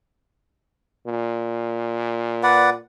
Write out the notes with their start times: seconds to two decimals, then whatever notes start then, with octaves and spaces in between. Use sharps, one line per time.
1.07 A#2
2.43 B4 D5 F#5